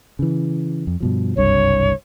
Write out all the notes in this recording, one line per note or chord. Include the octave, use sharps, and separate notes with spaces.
C#3 E3
F2
G2 B2 F3
F#1 C2 G2 C#5